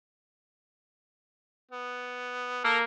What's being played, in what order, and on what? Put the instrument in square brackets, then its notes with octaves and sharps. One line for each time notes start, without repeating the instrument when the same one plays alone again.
[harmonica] B3
[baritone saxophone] A#3 [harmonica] A4 A#4